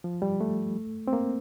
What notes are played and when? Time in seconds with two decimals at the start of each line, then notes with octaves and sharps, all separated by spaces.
0.04 F3
0.22 G3
0.41 A3
1.08 C4
1.13 A#3